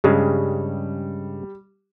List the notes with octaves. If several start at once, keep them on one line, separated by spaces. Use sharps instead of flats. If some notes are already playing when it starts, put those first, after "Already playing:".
G2 C#3 G3 G#3